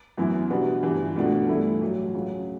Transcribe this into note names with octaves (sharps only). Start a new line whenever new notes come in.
F#2 E3 B3 E4
B2 G3 D4 F#4 B4
G1 G2 E3
C#2 B2 A3 D4 F#4
G1 G2 E3 A3 E4
A1 A2 F#3
C#2 C#3 F#3